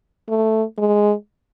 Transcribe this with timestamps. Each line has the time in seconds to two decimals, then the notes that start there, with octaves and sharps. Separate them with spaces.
0.29 A3
0.78 G#3